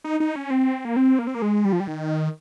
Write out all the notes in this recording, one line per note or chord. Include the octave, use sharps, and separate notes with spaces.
D#4
D#4
C#4
C4
A#3
C4
A#3
C4
A#3
G#3
G3
F3
G3
D#3